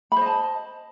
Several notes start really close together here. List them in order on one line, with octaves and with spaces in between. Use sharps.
B5 C5 D#5 A5